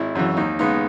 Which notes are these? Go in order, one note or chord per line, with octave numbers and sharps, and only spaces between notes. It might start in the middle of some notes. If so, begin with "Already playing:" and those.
Already playing: G#1 E4
F#2 C#3 E3
D#2 D#4
C#3 G#3 B3 D#4